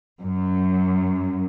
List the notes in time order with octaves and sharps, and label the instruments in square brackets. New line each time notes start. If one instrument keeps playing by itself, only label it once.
[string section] F#2